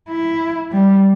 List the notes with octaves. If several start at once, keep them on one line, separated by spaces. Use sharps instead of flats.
E4
G3